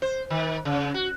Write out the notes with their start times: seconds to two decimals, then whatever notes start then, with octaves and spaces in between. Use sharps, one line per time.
0.02 C5
0.30 D#3
0.65 C#3
0.94 F#4